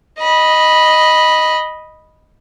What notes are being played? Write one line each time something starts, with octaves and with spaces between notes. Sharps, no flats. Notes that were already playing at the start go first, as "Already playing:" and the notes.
D#5 B5